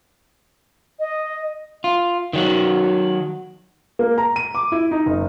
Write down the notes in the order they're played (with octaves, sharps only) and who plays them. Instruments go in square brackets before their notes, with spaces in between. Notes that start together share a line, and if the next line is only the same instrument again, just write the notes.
[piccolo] D#5
[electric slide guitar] F4
D#3 F#3 F#4
[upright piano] A#3
A#5
D#7
D6
E4
D#4
F#1